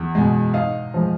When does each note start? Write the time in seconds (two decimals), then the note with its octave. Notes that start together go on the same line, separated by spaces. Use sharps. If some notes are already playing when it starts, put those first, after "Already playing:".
Already playing: E2
0.15 B2 G#3
0.54 G#2 D#5 F5
0.94 F3 G#3